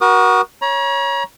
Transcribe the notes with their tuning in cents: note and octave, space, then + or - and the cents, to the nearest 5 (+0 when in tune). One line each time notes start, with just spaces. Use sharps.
F#4 +10 A#4 +35 D#6 -35
C#5 +0 A#5 +40